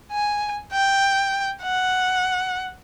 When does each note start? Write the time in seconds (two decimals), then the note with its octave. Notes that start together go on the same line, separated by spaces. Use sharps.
0.12 G#5
0.72 G5
1.62 F#5